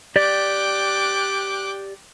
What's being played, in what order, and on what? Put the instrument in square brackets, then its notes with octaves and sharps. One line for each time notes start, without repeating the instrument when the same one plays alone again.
[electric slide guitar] G4 D5 [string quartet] G5 D6 F#6